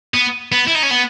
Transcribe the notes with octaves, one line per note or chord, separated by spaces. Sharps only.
B3
B3
E4
D#4
C#4
B3